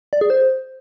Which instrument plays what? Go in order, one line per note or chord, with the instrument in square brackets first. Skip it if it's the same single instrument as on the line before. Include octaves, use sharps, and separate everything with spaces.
[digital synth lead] D5
G#4
C5